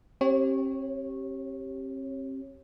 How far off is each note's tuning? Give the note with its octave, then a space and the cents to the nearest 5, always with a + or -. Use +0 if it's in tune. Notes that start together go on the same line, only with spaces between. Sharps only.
C4 +40 G4 -10 C#5 -15